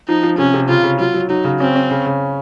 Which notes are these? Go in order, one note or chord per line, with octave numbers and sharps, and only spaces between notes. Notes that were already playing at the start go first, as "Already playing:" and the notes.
F3 D#4
F3
C3 C#4
C3
C#3 F4
C#3
F#3 F4
F#3
F#3 D#4
C#3
C4 C#4
C#4
C#3
C#3